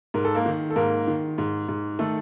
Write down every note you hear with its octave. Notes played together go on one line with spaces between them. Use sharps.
G#2 A#4
A4
A#3 A#4
D#3
A4
G#2 A#3 A#4
D#3
G#2
G#2
D#3 A3 A4